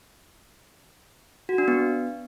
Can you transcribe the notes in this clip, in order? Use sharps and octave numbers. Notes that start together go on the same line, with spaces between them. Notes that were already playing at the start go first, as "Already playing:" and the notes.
F#4
D4
B3